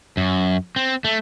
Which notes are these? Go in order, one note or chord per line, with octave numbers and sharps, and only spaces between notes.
F#2
C4
A3